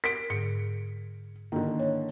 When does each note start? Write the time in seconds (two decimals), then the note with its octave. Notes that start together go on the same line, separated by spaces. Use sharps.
0.04 A#4 B6 D7
0.30 G#2 D3 C#7
1.52 D3 D#3 A#3 E4
1.79 C#5